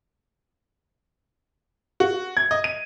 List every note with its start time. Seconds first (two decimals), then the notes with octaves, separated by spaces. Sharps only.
2.00 F#4
2.37 G#6
2.51 D#5
2.64 D#7